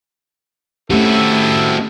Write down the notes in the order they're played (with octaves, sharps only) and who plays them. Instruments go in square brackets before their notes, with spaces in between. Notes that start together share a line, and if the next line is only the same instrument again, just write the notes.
[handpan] A3 C#4 G4 [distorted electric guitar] C4 F#4 [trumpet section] E4 A4